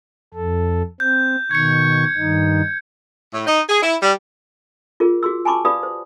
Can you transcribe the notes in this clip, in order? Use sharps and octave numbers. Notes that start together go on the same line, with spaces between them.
F2 A4
C4 G6
B2 D#3 C#6 G#6 C#7
G2 D#3 D#4
A2
D#4
G#4
E4
G3
F4 G#4 A#4
F#4 G#4 C6 E6
G#5 A5 B5 C#6 D6
G4 B4 D5 F5 B5 D#6
C5